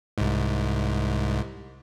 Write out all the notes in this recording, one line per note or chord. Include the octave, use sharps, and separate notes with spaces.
C2 G#2